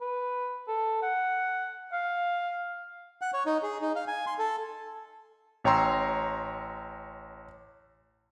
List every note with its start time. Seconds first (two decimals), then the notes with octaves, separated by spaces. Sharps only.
0.01 B4
0.67 A4
1.02 F#5
1.92 F5
3.21 F#5
3.33 C#5
3.46 D#4
3.63 G#4
3.81 D#4
3.96 F5
4.08 G#5
4.27 C6
4.38 A4
5.64 A1 C#5 G5 A#5 C6 E6